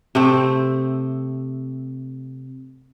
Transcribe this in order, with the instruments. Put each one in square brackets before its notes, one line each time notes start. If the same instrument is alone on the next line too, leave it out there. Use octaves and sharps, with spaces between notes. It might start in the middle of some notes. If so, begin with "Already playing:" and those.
[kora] C3 A3 C4